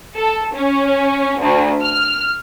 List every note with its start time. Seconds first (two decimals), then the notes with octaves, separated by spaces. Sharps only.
0.16 A4
0.55 C#4
1.41 D2
1.82 F6